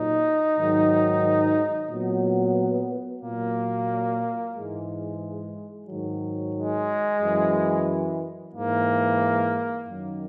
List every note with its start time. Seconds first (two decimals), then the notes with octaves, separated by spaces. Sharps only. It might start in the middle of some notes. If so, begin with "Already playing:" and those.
Already playing: A#2 F#3 D#4
0.56 G#2 D#3 F#3
1.89 A#2 F#3 B3
3.22 A#2 F#3 A#3
4.54 G#2 E3 G#3
5.87 G#2 D#3 F#3
6.54 G#3
7.21 F#2 E3
8.54 G#2 E3 A#3
9.86 F#2 D#3 F#3